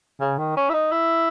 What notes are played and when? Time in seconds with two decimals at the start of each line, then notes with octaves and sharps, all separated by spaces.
0.21 C#3
0.38 D#3
0.57 C#4
0.70 E4
0.74 D#4
0.92 E4